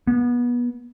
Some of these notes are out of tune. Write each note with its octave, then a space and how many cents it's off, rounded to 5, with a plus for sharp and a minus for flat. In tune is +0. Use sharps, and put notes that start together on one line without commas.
B3 -25